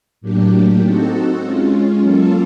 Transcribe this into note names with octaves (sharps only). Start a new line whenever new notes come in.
A2 F#3 A#3 D4 G4
C4 D#4 F#4 A4
G#3 C#4 F4
F#3 A#3 C#4 F4 A4